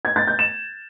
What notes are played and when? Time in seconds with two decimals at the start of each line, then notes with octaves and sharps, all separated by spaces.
0.05 G#6
0.16 A6
0.27 G6
0.39 E7